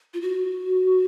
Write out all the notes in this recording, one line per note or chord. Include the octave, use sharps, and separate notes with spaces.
F4
F#4